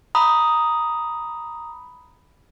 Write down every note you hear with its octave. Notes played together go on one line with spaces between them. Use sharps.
A#5 B5 D#6